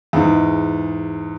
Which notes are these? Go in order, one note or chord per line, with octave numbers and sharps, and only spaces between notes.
E2 G#2